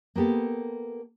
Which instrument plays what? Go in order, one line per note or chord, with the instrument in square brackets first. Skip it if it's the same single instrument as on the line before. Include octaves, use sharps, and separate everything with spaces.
[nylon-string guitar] A#3 B3 G4 A4